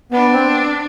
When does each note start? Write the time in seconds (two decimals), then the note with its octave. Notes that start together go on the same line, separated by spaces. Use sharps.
0.12 B3 D4
0.33 C4